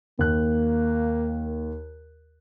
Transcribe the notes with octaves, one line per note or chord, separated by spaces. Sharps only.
D#2 A#3 F#6